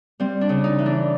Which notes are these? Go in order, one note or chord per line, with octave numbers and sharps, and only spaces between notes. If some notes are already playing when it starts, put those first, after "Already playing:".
G3 C4
D4
C#3
D#4
E3
D4